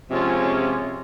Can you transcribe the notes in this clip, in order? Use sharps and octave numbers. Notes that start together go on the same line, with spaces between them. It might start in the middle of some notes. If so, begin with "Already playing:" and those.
C3 F3 G#3 C#4 F4